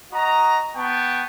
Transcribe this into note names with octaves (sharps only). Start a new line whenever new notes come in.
F#4 D#5 A#5
B3 G5 A5 C#6